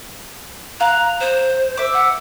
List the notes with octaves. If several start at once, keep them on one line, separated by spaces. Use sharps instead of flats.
F5 A#5 F#6
C5
E5 D6
F#5